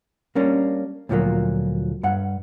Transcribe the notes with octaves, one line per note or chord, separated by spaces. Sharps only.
G3 A#3 C#4 D4
D2 A#2 F3 F#3 A#3
G2 F#5